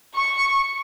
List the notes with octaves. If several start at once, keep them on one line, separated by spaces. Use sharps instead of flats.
C#6